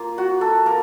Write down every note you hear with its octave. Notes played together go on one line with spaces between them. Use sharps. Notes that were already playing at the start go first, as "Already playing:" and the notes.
Already playing: A#3 F4
F#4
A4
A#3 A#4